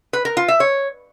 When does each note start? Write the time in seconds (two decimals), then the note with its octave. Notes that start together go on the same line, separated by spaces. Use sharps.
0.13 B4
0.25 A#4
0.37 F4
0.48 E5
0.60 C#5